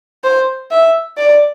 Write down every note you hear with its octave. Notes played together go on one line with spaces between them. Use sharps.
C5
E5
D5